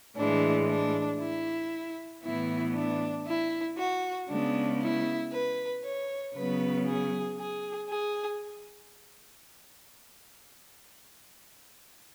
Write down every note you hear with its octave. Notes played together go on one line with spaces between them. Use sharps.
A2 E3 G#3 D4
D4
E4
A2 E3 B3 E4
D4
E4
F#4
C#3 G#3 B3 D4
E4
B4
C#5
C#3 F#3 B3 B4
G#4
G#4
G#4